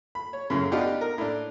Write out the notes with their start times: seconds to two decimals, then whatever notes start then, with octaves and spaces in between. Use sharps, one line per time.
0.15 B5
0.33 C#5
0.50 F#2 A2 C#3
0.72 B3 D4 D#4 F4 G4 F#5
1.01 A#4
1.18 A2 D4